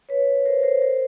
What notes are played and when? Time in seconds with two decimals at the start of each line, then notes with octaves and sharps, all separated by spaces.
0.09 B4 C#5
0.46 A#4 C5
0.63 A#4 C5
0.82 A#4 C5